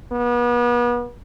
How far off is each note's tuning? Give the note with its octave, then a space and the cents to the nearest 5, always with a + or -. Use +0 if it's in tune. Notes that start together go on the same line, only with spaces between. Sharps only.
B3 -35